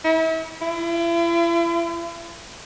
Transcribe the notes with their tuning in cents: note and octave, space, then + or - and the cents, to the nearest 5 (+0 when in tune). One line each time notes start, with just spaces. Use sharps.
E4 -35
E4 +40